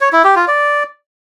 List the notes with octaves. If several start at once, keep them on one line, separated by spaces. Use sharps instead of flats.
C#5
E4
G4
F4
D5